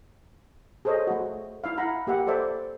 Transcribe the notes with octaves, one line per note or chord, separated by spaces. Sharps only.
G#4 A4 C5 C#5 D#5
A3 F#4
E4 E5 F5
E4 F#5 A#5 B5
A#3 G4 E5 F#5
A4 C5 D5 E5